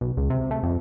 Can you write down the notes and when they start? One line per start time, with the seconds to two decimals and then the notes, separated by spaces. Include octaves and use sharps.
0.01 B1
0.17 C#2
0.30 C3
0.51 A3
0.63 F2